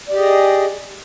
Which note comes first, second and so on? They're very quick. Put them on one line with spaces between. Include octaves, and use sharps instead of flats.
D5 G4 D#5 G#4